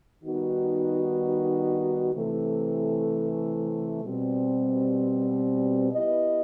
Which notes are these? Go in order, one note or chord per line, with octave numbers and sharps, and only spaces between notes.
D#3 G3 B3 D#4 F#4
C3 E3 A3
B2 G3 C4
B3 E4 G4 B4 D#5